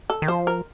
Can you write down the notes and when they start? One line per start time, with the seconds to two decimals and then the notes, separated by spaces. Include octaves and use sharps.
0.10 A4
0.22 D#3
0.28 F3 C5
0.47 A#4